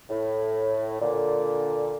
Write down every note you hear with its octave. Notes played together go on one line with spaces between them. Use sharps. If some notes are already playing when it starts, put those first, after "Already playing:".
A2
A#2 D3